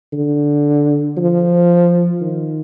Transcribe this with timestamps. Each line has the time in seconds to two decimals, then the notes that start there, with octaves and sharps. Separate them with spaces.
0.13 D3
1.17 F3
2.21 D#3